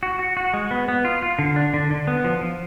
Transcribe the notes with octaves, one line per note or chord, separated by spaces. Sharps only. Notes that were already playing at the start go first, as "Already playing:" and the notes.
F#4
F#4
F#4
G#3
B3
B3
F4
F4
D3
D4
D3
D3
B3
F3
F3